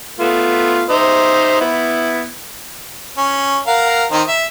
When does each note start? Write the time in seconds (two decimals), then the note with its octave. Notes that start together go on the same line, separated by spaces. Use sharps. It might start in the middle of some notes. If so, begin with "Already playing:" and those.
0.19 A3 B3 F4
0.90 D#4 C5 E5
1.61 B3 E4
3.18 C#4
3.67 A#4 F5 F#5
4.12 D#3 C4 D#4
4.28 E5